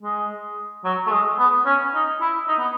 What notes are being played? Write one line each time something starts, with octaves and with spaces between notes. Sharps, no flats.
G#3
F#3
A3
G#3
B3
C#4
D#4
E4
D#4
B3